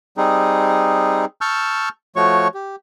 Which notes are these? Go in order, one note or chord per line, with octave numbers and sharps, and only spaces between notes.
G3 C4 D#4 G#4
A5 C#6 E6 F6 G6
F3 A3 F#4 C#5 C#6
G4